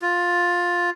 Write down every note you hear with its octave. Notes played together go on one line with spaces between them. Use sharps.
F4